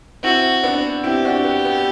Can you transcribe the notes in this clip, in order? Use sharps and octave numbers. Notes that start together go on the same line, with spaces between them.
C4 E4 F#4
B3 D4
C4 E4 G4
D4 F#4
B3
B3